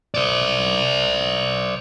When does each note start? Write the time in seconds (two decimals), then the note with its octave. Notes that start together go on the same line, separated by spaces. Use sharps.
0.14 C5 D5